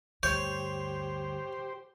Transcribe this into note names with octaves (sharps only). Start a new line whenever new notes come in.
D2 G2 G4 C5 C#5 G6